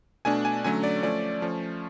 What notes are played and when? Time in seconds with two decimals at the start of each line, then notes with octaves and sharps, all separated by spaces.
0.25 B2 A3 D4 G#5
0.45 G#5
0.64 D3 F#3 A3 C#4 G#5
0.83 D5
1.03 F3 A3 C#4 D5
1.42 F3 A3 C#4